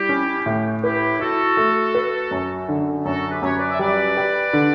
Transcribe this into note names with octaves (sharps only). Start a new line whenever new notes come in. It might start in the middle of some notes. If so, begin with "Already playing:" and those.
Already playing: G3 E4 G4
C#4
A2
E4 G4 B4
E4 F#4 A4
A3
B4
F#2
D3
F#2 F#4 A4
G4 B4
F#2 C#5
B4 D5
E5
G3 B4 D5
G4
D3